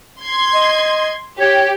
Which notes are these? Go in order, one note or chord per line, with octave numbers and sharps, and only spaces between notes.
C6 G#6
D#5
G4 C#5